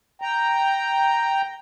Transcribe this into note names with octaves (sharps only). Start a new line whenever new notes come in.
G5 A#5